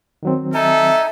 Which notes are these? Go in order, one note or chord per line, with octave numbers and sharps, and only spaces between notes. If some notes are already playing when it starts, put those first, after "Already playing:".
D#3 F#3 C4
D#4 A4 E5 G#5